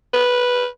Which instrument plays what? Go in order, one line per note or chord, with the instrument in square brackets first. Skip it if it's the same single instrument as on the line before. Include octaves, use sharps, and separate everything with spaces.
[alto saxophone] B4